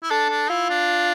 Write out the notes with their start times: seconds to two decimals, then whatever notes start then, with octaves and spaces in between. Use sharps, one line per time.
0.03 E4
0.10 D4 A4
0.30 D4
0.50 E4 F4
0.70 D4